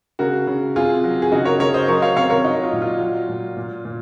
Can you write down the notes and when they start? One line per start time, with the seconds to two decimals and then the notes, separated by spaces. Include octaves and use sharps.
0.19 C#3 F#4 A#4
0.47 C#3
0.76 C3 F4 G#4
1.04 F#3
1.22 G#4
1.32 C#3 D#4 F#4
1.45 A#4 C#5
1.60 C#3 A#4 C#5
1.74 C5 D#5
1.88 F#3 A#4 C#5
2.02 C#5 F5
2.16 C3 C#5 F5
2.30 A#4 C#5
2.44 F#3 D#4
2.64 F4
2.73 A#2
2.82 F4
3.00 F#3
3.29 A#2
3.57 A#2
3.85 A#2